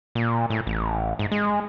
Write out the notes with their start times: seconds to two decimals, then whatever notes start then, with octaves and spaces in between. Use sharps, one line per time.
0.15 A#2
0.50 A2
0.67 A1
1.19 G#2
1.32 G#3